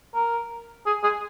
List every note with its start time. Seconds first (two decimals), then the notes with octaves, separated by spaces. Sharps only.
0.14 A#4
0.86 G#4
1.03 G#4